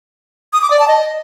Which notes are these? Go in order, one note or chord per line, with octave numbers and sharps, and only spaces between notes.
D#6
D6
D5
A5
D#5